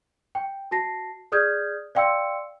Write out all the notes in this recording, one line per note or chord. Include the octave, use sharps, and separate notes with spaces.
G5
F#4 A5 A#6 C7
G#4 D5 D#6 F6 G6 G#6
D5 F5 G5 C6 E6 C#7